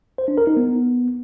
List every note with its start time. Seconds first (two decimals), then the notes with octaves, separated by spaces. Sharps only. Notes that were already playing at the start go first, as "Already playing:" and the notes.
0.18 C5
0.28 D4
0.38 A#4
0.47 D#4
0.57 B3